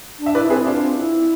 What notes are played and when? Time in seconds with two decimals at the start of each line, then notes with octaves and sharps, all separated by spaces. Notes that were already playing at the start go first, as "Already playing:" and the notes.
0.19 D4
0.26 E5
0.35 E4 B4 D5
0.50 C4 G#4 B4
0.65 C4 D4 F4
0.80 C4
0.96 E4